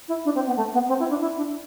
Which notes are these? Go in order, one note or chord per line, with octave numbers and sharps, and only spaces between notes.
E4
D4
C4
B3
A3
B3
C4
E4
D4
E4
D4